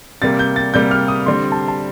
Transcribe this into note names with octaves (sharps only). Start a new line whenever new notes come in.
C3 G3 A#3 A6
G6
A6
C3 G3 A#3 G6
F6
D#6
D3 G3 C4 C6
A5
A5